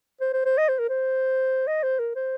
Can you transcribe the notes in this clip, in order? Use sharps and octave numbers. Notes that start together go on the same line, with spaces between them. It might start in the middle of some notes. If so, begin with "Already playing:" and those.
C5
C5
C5
D#5
C5
A#4
C5
D#5
C5
A#4
C5